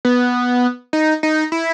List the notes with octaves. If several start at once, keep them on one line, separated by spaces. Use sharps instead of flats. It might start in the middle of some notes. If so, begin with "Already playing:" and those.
B3
D#4
D#4
E4